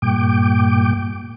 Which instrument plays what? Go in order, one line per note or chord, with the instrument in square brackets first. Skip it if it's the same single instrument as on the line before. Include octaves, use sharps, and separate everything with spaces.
[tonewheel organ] G2 A#2 G5 D6